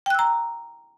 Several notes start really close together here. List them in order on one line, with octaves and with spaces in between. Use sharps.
G5 F#6 E6 A#5